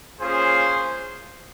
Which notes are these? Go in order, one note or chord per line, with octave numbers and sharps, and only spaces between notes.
A#3 C#4 F4 G#4 C5